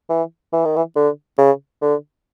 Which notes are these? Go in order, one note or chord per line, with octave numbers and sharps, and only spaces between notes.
E3
E3
D#3
E3
D3
C#3
D3